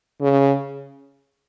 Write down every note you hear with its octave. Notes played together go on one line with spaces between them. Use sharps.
C#3